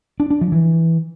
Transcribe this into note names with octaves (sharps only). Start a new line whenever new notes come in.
D4
D4
F3
E3